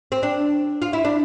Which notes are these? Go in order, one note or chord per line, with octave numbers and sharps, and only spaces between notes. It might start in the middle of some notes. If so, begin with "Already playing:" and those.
C4
D4
F4
E4
D4